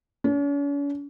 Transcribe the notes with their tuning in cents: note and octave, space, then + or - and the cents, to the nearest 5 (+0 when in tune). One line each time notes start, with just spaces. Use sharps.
C#4 +45